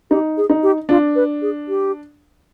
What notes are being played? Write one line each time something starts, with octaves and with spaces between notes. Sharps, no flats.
D#4 G4
G#4
D#4
G4
D4 F4
B4
G#4
G4